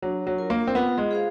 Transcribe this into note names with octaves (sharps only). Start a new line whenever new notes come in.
F#3 D4
F#3
F4 A#4
A#3
C4
B3 F4
G#3
G#4 C5 F5